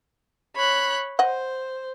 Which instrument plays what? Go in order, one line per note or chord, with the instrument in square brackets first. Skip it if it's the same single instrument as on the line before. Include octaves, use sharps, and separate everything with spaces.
[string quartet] C#5 B5 F#6
[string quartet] C5 [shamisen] D#5 F#5